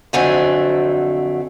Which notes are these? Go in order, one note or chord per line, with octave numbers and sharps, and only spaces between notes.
F2 D3 F#3 A3 C4 G#5